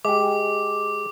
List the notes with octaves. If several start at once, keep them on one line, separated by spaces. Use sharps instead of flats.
G#3 G4 D6